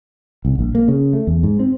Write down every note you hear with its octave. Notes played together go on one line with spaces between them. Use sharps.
C2
A#1
A#3
C#3
A3
E2
G#2
C4